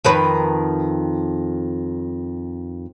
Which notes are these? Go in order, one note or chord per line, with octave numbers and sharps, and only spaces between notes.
F2 D#3 B4